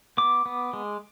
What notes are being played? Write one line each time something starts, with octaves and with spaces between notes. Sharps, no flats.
B3 D6
B3
G#3